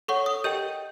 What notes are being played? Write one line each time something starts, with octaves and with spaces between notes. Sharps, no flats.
A4 C#5 F#5 C#6
D#6
G4 A#4 D#5 G5 G6